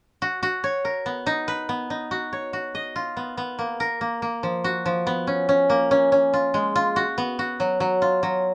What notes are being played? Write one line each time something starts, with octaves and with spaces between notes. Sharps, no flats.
F#4
F#4
C#5
A#4
B3
D#4
B4
B3
D#4
F#4
C#5
F#4
D#5
F4
B3
B3
A#3
A#4
A#3
A#3
F3
F#4
F3
B3
C#4
C#4
A#3
C#4
C#4
F4
G#3
F4
F#4
B3
F#4
F#3
F#3
F4
F#3